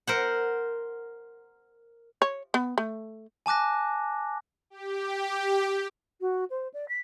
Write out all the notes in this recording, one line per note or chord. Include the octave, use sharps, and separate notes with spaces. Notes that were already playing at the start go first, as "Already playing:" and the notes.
A#4 C5 F#5
C#5
B3
A3
G#5 A5 D6 F#6 A#6
G4
F#4
C5
D5
B6